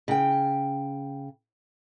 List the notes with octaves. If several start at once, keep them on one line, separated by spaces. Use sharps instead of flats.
C#3 G5